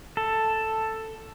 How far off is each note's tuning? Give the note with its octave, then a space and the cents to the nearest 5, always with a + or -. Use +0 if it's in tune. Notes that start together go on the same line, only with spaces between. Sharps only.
A4 +5